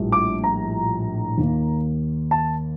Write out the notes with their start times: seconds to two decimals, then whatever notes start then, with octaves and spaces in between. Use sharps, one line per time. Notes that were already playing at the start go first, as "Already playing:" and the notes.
Already playing: A#1 A2 G3
0.12 D6
0.44 A#5
1.37 D#2 D#3 A#3
2.31 A5